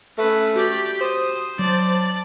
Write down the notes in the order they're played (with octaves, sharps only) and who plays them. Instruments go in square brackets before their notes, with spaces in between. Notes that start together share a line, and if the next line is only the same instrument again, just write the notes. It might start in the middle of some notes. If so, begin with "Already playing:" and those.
[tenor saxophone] A3 [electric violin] C#4 B4
[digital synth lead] F#4 [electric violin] G4 D5
[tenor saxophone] C5 [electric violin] D#6
[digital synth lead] F#3 [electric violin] D5 A5